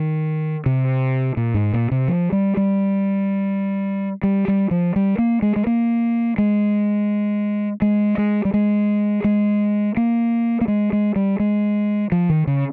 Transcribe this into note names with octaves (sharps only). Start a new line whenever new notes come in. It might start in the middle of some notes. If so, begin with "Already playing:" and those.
Already playing: D#3
C3
A#2
G#2
A#2
C3
F3
G3
G3
G3
G3
F3
G3
A#3
G#3
G#3
A#3
G#3
G#3
G#3
G3
G#3
G#3
A#3
A#3
G#3
G#3
G3
G#3
F3
D#3
C#3